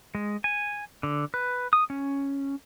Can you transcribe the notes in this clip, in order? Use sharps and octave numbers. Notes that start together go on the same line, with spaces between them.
G#3
G#5
D3
B4
D#6
C#4